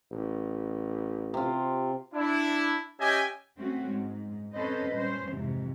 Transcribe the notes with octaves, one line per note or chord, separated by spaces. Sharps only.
A1
C3 F4
D4 E4
C#4 G4 D#5 E5 G5 G#5
A3 C4 C#4 F#4
G#2
C4 C#4 A4 B4 C5 D#5
A#2 G3 C#4 C5
F2 G#2 C3 E3